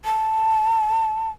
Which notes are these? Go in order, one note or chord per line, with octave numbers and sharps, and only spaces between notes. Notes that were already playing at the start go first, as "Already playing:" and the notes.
A5